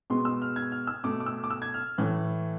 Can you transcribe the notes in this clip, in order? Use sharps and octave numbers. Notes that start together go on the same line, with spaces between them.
B2 G#3 B3 C6
E6
F6
G#6
F6
E6
B2 A3 D6
D6
E6
D6
E6
G#6
F6
A2 E3 A3